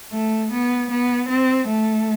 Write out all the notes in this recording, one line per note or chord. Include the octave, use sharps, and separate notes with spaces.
A3
B3
B3
C4
A3